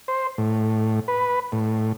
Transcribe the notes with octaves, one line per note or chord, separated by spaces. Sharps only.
C5
A2
B4
A2